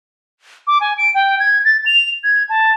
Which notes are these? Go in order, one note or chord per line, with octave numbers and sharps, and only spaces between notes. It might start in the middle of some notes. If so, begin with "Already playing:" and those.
D6
G#5
D7
G5
G#6
A6
F7
G#6
A5